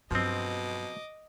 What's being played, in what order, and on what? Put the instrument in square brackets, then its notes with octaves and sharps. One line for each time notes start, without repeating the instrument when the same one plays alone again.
[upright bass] G2 F#3 [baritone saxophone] B2 [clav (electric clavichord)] F3 C4 [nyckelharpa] D#5 D6